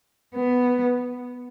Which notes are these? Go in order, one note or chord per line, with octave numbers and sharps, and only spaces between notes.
B3